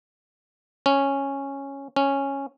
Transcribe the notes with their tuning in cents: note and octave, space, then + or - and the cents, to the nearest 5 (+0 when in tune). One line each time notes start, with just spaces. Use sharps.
C#4 -5
C#4 -5